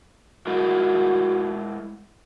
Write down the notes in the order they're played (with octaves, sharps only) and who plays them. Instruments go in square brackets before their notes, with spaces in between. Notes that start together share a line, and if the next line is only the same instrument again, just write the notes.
[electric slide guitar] G#3 E4 A#4 [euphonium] F#4